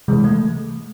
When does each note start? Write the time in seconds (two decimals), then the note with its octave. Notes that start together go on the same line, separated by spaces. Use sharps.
0.08 C3 E3 G#3
0.24 A3